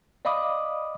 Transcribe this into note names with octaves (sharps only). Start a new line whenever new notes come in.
D5 D#5 F5 B5 D6 D#6